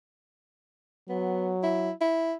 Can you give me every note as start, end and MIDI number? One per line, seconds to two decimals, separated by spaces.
1.10 1.91 54
1.10 1.53 59
1.63 1.92 64
2.01 2.35 64